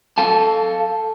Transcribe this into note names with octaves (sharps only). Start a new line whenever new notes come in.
A4 F5 A5